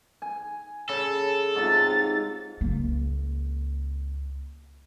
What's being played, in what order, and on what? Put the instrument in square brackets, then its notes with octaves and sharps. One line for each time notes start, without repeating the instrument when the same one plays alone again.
[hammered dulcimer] G#5
[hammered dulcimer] C#3 [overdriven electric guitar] A4
[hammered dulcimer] G#2 C3 [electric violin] F4 A6
[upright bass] C#2 A#3